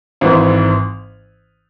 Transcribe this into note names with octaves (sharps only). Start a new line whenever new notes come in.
G#1 G#2 E3